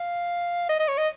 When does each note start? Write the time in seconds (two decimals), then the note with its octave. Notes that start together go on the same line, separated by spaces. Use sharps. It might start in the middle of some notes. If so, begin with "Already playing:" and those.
Already playing: F5
0.69 D#5
0.80 D#5
0.88 C#5
0.98 D#5